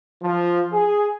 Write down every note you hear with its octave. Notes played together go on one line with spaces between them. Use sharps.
F3
G#4